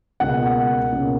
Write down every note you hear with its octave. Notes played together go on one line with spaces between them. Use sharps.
C#2 B2 A#3 F#5
C#2 B2 A#3 C#4